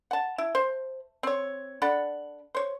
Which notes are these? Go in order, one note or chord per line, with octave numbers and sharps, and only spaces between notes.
F#5 A5
E4
C5
C4 C#5
D4 A4 F#5 B5
C5 C#5